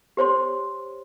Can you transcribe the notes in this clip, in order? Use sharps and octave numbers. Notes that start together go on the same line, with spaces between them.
G4 C5 C#5 C6